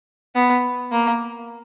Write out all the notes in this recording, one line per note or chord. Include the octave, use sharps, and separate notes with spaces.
B3
A#3